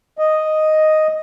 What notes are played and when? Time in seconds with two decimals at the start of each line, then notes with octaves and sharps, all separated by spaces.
0.18 D#5